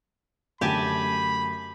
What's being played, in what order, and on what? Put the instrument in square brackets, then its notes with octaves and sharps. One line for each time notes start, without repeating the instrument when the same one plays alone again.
[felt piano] F#2 D3 A3 [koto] G4 G#5 A5 [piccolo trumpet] B5